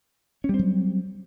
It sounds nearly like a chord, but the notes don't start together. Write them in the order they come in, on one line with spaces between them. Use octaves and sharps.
C#4 G3 C4 F#3